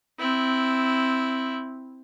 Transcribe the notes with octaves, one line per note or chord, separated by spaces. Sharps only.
C4 E4